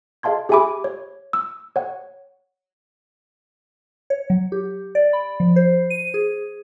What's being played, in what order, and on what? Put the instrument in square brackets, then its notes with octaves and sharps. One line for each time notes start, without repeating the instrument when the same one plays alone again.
[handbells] G#4 D#5 F5 A5 C6 G#6
G4 G#4 E5 G#5 B5 D6
C#5
E6
C#5 F#5
[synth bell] C#5
F#3
G4
D5
B5
F3
C5
D#7
G#4